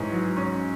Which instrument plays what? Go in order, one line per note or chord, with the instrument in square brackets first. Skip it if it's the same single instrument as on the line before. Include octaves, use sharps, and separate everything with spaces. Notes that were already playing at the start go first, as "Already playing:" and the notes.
Already playing: [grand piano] G#2 C#4 G#4 [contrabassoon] E3
[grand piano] F#3
C#4